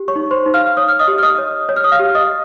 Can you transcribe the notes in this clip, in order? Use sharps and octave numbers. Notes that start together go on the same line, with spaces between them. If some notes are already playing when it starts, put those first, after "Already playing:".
Already playing: G4
C#5 C#6
D#4
C5 C6
D#4
F5 F6
C#5 D#6
F6
D#5 D#6
G4
F6
D#5 D#6
C#5
C#5
F6
D#6
F5 F6
G4
D#5 D#6